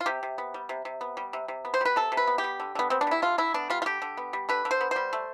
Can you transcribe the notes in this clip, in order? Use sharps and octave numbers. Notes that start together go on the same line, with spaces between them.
F4
C3 G4
C3
B3
G3
C3
C3
B3
G3
C3
C3
B3
C5
G3 B4
C3 A4
C3
B4
B3
G4
G3
D3
D3 B3
B3 C4
D4
G3 E4
D3 F4
D3 E4
B3 D4
G3 F4
F4
D3 G4
D3
B3
G3
D3 B4
D3
C5
B3
G3 C5
A3